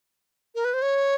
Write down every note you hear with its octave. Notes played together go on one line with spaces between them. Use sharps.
A#4
B4
C5
C#5